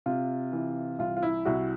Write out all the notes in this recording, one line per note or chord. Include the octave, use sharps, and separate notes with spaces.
C3 F4
E3
C2 F4
F4
E4
C2 E4 F#4